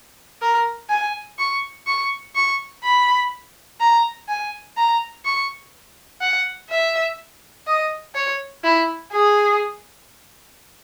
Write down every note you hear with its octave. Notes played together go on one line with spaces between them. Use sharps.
A#4
G#5
C#6
C#6
C#6
B5
A#5
G#5
A#5
C#6
F#5
E5
D#5
C#5
E4
G#4